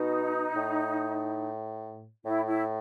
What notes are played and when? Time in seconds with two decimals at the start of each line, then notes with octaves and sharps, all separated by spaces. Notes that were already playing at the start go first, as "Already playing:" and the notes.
Already playing: B2 D#4
0.56 A2
2.25 A2 E4
2.47 E4